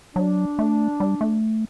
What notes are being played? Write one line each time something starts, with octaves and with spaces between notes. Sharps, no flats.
F#3 D4
A3
G3
A3